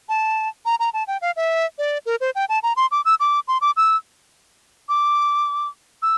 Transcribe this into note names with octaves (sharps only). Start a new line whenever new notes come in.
A5
A#5
A#5
A5
G5
F5
E5
D5
A#4
C5
G5
A5
A#5
C6
D6
E6
D6
C6
D6
E6
D6
E6